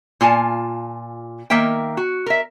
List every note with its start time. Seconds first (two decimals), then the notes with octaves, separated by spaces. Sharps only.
0.21 A#2 F4 G#5 A5
1.50 D#3 A#3 A#4 E5 G5
1.97 F#4
2.26 A#4 E5